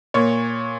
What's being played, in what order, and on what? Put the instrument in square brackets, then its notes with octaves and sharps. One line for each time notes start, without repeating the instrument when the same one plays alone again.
[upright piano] A#2 C#5